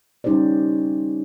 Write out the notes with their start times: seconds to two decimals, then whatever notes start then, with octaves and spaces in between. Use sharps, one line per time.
0.24 G3 C#4 D#4 G4 C5 D5